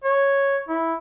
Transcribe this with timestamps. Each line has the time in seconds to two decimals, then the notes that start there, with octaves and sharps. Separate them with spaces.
0.04 C#5
0.69 E4